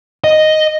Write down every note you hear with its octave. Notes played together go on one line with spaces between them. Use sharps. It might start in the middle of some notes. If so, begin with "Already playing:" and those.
D#5